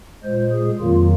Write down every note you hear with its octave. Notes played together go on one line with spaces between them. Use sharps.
A#2 G#3 C5
G#4
F2 D#3 F#3 A#3 F4